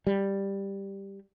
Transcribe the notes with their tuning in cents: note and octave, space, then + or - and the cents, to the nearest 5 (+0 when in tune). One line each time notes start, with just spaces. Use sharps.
G3 +5